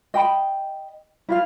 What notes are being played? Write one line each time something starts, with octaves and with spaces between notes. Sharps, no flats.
D#5 G5 B5
E4 F4 F5